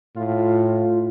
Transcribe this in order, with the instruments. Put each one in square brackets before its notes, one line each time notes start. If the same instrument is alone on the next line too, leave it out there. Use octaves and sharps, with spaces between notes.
[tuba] A2 [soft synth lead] F4